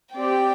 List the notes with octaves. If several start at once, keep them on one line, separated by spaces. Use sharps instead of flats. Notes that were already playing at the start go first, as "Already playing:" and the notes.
C4 G4 D5 G5